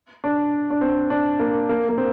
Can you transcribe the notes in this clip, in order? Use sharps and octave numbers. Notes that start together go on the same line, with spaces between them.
D4
D4
C4
D4
A#3
A#3
A#3
C4